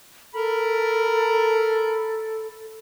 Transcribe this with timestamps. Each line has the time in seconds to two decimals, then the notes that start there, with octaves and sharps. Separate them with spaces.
0.34 A4 A#4 B5